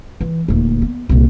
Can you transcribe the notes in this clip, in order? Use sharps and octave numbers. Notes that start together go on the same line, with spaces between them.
E3
D#1 D2
B3
C2 A#2